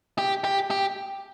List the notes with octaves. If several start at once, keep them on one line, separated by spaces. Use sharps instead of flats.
G4
G4
G4